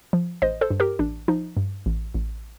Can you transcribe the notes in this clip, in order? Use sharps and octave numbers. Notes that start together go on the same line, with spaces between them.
F3
A1 C5 D#5
A4 C5
G2
G4 A#4
A1 D4
F3 D#4
G2
A1
A1